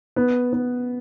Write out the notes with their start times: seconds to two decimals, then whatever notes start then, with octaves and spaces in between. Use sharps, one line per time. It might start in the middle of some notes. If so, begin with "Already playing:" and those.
0.16 B3
0.53 B3